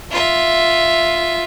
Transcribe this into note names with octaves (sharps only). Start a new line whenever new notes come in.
F4 E5